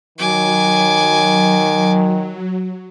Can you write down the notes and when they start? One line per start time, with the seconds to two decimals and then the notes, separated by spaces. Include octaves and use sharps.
0.18 D#3 F#3 G#5 D6